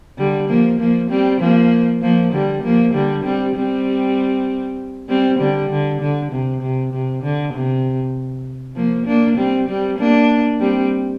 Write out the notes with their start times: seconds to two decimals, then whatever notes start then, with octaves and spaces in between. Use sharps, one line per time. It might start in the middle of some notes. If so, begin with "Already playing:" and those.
0.18 D3 G3
0.49 F3 A#3
0.79 F3 A#3
1.10 G3 C4
1.41 F3 A#3
2.02 F3 A#3
2.32 D3 G3
2.63 F3 A#3
2.94 D3 G3
3.24 G3 C4
3.56 G3 C4
5.09 G3 C4
5.39 D3 G3
5.70 D3
6.01 D3
6.32 C3
6.61 C3
6.93 C3
7.23 D3
7.53 C3
8.76 F3 A#3
9.07 A#3 D4
9.37 G3 C4
9.68 G3 C4
9.99 A#3 D4
10.60 G3 C4